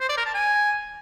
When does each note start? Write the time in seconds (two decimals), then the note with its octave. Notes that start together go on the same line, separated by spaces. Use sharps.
0.01 C5
0.09 D5
0.17 A#4
0.26 A5
0.34 G#5